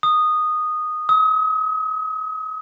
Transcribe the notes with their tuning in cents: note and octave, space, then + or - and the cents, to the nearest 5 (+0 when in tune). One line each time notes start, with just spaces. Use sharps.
D#6 -10
D#6 +40